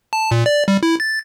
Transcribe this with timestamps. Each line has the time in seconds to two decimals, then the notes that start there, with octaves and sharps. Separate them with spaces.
0.13 A5
0.31 A#2
0.46 D5
0.68 G3
0.83 E4
1.00 A6